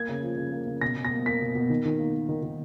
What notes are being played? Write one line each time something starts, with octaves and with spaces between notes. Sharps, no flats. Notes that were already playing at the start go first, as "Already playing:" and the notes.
Already playing: A#3 G#6
C#3
F3
C#3
A#3
C#3
B2 A#6
B2
A#6
A#3
A#3 B6
B2
B2
D#3
D#3
A#3
A#3
D#3
D#3